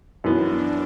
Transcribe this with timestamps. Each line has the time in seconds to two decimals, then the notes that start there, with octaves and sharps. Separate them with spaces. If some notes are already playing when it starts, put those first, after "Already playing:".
0.24 F#2 E3 B3 D4